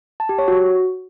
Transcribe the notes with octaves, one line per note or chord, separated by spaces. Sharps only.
A5
G4
C#5
F#4